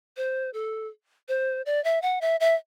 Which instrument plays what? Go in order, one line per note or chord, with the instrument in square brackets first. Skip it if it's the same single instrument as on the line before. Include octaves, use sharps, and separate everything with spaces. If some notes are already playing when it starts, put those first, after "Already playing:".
[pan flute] C5
A4
C5
D5
E5
F#5
E5
E5